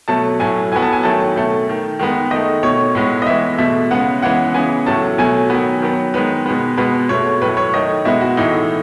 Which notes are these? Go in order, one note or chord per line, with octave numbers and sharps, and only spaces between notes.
B2 F#3 A3 A5
A2 F#3 A3 G#5
A2 F#3 B3 G#5
A5
G#5
D#3 F#3 A3 A5
B2 A3
D#3 A3
D#3 G#3 B3
D#3 A3 D#5
B2 A3 C#5
A2 G#3 B3
D#5
A2 E3 G#3 B3 E5
B2 A3 E5
C#3 G#3 B3 F#5
C#3 E3 G#3 B3 F#5
C#3 E3 B3 G#5
A2 F#3 A3 A5
B2 F#3 A3 G#5
D#3 F#3 B3
D#3 F#3 B3
D#3 G#3 B3 B4
B2 G#3 B3
B2 G#3 B3 B4
B2 A3 C#5
A2 F#3 A3 B4
C#5
D#3 A3 D#5
B2 G#3 B3 E4
F#4
A2 E3 A3 D#4